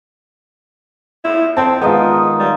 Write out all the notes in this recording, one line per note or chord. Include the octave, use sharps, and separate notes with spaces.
E4 F4
C4 A5 C6
D#3 G#3 B3 D#4 F4 D#5
G3